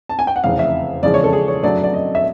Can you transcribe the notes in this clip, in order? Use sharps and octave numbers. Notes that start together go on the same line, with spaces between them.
A5
G#5
G5
F#5
F1 E2 C#3 F5
E5
E2 C#3 F3 G#3 D5
C#5
A4
G#4
C#5
F#2 D3 F#3 A3 D5
D5
D#5
E5